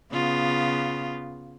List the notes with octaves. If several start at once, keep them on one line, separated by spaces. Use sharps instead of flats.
C#3 B3 F4